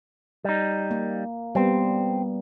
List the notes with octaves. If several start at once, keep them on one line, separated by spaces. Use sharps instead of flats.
G3 D#4
A#3
G3 B3 C4